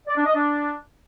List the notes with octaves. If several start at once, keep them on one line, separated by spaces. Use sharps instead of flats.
D5
D4
D#5
D4